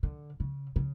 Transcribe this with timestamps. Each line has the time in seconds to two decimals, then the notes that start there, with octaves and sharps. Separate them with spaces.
0.03 D3
0.40 C#3
0.76 C#3